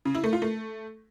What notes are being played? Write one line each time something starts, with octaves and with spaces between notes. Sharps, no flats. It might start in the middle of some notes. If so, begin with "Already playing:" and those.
C#3
E4
A3
F4
A3